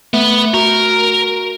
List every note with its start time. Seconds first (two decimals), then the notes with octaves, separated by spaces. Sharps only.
0.14 A3 B3
0.54 F#4 A#4